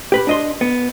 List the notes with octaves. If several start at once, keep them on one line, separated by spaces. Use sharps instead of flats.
G4 B4 B5
D4 D#5 C6
B3